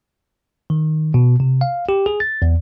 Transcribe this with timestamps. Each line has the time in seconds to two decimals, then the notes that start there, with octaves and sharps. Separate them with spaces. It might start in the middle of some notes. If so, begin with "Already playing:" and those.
0.70 D#3
1.14 B2
1.40 C3
1.61 F5
1.89 G4
2.06 G#4
2.20 A6
2.42 E2